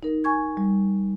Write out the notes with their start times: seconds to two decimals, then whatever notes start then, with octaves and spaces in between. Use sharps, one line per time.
0.03 D#4 A#4
0.24 G#5 C#6 G#6
0.57 G3